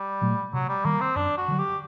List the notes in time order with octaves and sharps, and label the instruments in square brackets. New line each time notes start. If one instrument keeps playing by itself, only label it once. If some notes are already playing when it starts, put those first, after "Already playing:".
Already playing: [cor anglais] G3
[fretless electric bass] A#2 F#3 A3
[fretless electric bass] C3 [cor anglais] F#3
[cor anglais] G3
[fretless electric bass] D#3 G3 [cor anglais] A#3
[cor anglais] C4
[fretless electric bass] F#2 [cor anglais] D4
[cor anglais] F#4
[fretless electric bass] D3 F#3
[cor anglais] G4